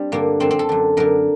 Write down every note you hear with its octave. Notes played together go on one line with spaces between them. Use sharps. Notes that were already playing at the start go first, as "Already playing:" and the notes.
Already playing: G3 C4 D4
G2 D3 A#3
F#2 D3 C4
C4
A4
F#2 D3
F#2 D3 A#4